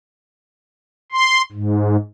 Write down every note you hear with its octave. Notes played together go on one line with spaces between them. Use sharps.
C6
G#2